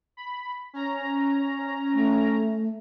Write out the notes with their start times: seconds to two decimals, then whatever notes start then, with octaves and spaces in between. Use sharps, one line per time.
0.17 B5
0.73 C#4 A#5
1.94 A3